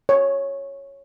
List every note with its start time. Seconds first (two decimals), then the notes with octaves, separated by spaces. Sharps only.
0.09 C#5